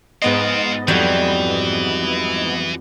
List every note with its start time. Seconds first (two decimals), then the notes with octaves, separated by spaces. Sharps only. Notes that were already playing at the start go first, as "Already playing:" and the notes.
0.22 G#2 B3 C4 F4 D#5
0.88 F2 E3 F#3 G3